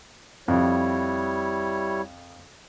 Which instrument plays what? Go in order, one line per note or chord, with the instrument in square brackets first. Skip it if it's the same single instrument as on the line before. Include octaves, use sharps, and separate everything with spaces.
[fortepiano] F2 [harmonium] G3 E4 C#5